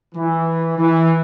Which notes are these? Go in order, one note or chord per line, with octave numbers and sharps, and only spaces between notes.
E3
E3